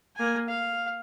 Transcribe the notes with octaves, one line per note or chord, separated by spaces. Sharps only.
A#3 G#5
F5